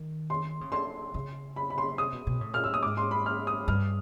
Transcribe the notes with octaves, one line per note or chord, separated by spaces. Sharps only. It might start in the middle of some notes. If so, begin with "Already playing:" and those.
Already playing: D#3
C6
C#3
D3 C6
C#3
B5
B5
C6
C3 D#6
B2
B2
A2
A#2 F6
A2 E6
D#6
G#2 D6
C6
B5
F6
D#6
G2 F6